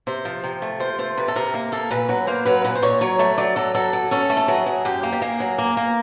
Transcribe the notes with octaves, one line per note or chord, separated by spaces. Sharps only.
C3 C5
F3
C3
A3
F3 C5
A3 C5
C3 B4
A4
C3 A#4
A#3 A#4
A#3 A4
A#2 B4
F#3 B4
A#3 C5
F#3 B4
A#2 B4
C5
A#2 C#5
F#3 C#5
A3 C#5
F#3 D5
F#3 A4
F#3 A4
F#3
C#4 A4
A3
A4
F#3 G#4
F#3
F#2 G4
A#3
G4
A#3 G#4
F#3
A#3
A#3